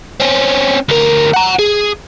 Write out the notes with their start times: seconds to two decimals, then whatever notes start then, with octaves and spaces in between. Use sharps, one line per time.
0.20 C4 C#4
0.89 D2 A#4
1.34 F#5 A#5
1.59 G#4